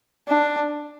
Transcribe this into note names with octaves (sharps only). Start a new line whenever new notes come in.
D4